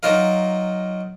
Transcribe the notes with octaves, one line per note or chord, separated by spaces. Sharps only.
F#3 D#4 F4 A#4 F5